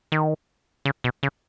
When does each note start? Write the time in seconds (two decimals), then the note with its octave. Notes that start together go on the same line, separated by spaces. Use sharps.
0.12 D#3
0.85 C#3
1.04 B2
1.23 C#3